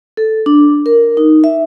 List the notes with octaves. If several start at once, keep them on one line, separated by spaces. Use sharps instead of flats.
A4
D4
A#4
D#4
E5